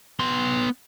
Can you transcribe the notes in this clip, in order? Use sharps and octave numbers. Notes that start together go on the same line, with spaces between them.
B3 C6